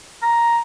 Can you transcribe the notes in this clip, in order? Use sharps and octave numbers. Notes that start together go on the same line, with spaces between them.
A#5